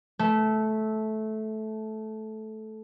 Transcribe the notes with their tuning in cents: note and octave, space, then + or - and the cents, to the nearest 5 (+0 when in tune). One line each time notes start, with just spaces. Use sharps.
A3 -15